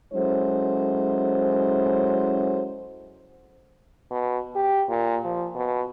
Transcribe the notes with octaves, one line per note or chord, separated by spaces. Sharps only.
F#3 G#3 C#4 E4 A4 C5
B2
G4
A#2
F3
B2